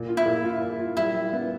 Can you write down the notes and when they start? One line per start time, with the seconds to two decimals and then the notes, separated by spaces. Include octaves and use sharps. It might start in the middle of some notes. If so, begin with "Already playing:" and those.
Already playing: A#2
0.09 F4
0.17 E4
0.26 A#2
0.44 F4
0.61 A#2
0.79 F4
0.97 G3 E4
1.14 G3
1.33 B3